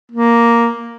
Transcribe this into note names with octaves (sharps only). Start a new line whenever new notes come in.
A#3